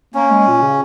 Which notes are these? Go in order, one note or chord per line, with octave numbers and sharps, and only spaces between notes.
A#3 C#4
G#3
A#2
C#3